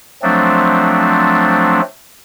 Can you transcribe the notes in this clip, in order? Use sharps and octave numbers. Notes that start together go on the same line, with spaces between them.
F3 F#3 A3 C4 D4